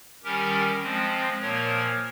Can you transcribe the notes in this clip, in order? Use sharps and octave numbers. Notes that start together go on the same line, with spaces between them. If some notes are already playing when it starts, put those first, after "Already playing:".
D#3 G3 C#4 G4 A#4
F3 G#3 C4
A#2 F3 A#3 A#4 C#5